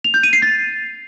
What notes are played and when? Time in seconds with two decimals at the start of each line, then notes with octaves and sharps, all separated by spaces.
0.04 F7
0.14 G6
0.23 D#7
0.33 C7
0.42 A6